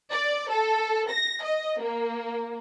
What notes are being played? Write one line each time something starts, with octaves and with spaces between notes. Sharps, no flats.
D5
A4
A#6
D#5
A#3